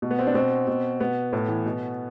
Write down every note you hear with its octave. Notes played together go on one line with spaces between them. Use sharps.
B2
B3
C4
D4
B2 C4
B2
B2 B3
A2
E3
B2